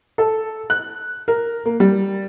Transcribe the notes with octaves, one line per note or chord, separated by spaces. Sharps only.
A4
F#6
A#4
A#3
G3